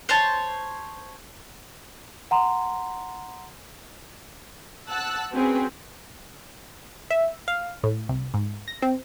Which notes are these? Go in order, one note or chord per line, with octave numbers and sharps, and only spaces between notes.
C5 C#5 A5
F#5 A#5 C6
F#5 A5 E6 F#6
C4 C#4 F#4 G#4 B4
E5
F5
A2
C2
G#2
A#6
C4